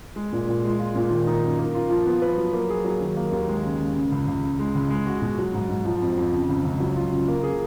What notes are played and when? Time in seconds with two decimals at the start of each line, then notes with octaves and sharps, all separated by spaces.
0.16 G#3
0.33 A#2
0.47 A#2
0.64 G#3
0.79 F4
0.95 A#2
1.10 D#3
1.27 D#4
1.42 F#2
1.59 A#3
1.74 F4
1.89 F3
2.06 B3
2.22 B4
2.37 F#3
2.53 A#3
2.70 G#4
2.85 F#3
3.01 D#3
3.17 A#3
3.32 D#2
3.48 G#3
3.64 C#3
3.80 C#3
3.95 C#3
4.12 C#2
4.27 C#2
4.44 C#3
4.59 G#3
4.75 C#2
4.90 G#3
5.07 F#4
5.22 B2
5.39 F#3
5.53 G#2
5.69 G#2
5.85 F3
6.01 F2
6.17 F2
6.32 C#3
6.49 C#2
6.64 C#2
6.80 F#3
6.96 F4
7.12 C#3
7.28 A#3
7.43 G#4